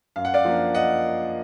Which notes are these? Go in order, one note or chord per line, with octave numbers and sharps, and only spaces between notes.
F#2 F5
F#5
D5 F5
F3 A#3 D4
D#5 F#5